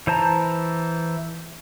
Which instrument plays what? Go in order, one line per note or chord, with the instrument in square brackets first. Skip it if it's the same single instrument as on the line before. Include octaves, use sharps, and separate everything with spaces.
[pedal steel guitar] E3 C5 A5 A#5